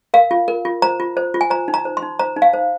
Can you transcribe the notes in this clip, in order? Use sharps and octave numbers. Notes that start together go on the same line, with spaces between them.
A#4 F5
F4
A#4
F4
C5 A#5
F4
C5
F4
G#5
C5 A#5
D#4
A#5
C5
C6
D#4
C5 A#5
D#4
F5
C5